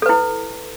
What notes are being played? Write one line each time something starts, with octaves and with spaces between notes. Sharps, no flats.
E4 A4 B4